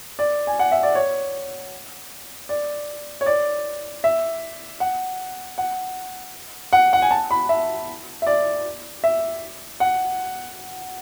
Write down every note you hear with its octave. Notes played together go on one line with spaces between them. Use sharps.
D5
G#5
F#5
E5
D5
C#5
D5
C#5
D5
E5
F#5
F#5
F#5
F#5
G#5
A5
B5
E5
E5
D5
E5
F#5